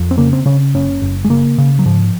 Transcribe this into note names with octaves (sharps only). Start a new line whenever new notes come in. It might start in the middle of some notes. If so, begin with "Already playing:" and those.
Already playing: F2
C4
C#3 A#3
C4
C#3 C#4
F#1 C#4
F#1
G#3
C#3 A#3
C#3
F#3
G#2 F3